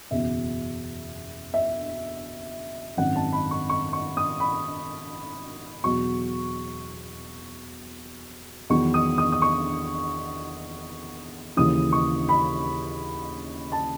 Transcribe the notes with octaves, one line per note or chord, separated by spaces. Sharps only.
F#1 E2 B2 E5
E5
G#1 F#2 D#3 F#5
A5
B5
C#6
C#6
C#6
D#6
B5
E2 B2 F#3 C#6
E2 D#3 F#3 C#6
D#6
D#6
D#6
C#6
D#2 C#3 E3 D#6
C#6
B5
A5